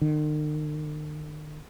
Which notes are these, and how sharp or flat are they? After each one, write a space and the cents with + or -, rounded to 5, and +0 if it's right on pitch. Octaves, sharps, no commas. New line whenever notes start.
D#3 -45